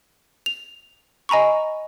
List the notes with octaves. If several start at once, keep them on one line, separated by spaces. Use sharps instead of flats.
F7
D#5 G#5 A#5 B5 C#6